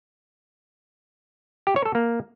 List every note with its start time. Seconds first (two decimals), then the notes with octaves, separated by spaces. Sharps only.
1.67 G4
1.76 C#5
1.85 A4
1.95 A#3